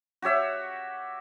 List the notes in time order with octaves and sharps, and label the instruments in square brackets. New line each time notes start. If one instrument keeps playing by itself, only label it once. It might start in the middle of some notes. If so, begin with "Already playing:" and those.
[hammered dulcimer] F#4 G4 C#5 E5